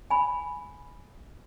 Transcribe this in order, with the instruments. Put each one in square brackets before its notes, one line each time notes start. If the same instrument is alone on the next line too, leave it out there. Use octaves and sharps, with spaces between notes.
[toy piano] G#5 B5